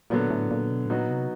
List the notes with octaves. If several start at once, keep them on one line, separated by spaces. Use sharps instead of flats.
A#2 D3 F#3 B3
A2
A#2
B2
A2
A#2 F#3 B3 D#4 F#4
C3